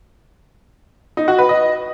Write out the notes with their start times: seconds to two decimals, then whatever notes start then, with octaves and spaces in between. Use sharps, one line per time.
1.17 D#4
1.28 F#4
1.38 B4
1.49 D#5